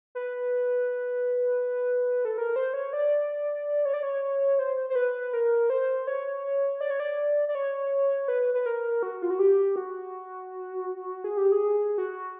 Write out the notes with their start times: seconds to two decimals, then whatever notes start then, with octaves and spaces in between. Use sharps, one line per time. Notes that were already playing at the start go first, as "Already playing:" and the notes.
0.15 B4
2.25 A4
2.38 A#4
2.56 C5
2.74 C#5
2.93 D5
3.85 C#5
3.94 D5
4.03 C#5
4.59 C5
4.90 C5
4.95 B4
5.33 A#4
5.70 C5
6.07 C#5
6.81 D5
6.90 C#5
7.00 D5
7.49 D5
7.55 C#5
8.28 B4
8.54 B4
8.66 A#4
9.03 F#4
9.22 F4
9.30 F#4
9.39 G4
9.76 F#4
11.24 G#4
11.37 G4
11.52 G#4
11.98 F#4